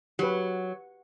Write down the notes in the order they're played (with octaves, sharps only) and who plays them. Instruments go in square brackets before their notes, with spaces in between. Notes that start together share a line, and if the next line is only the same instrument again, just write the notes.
[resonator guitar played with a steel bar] F#3 [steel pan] G4 B4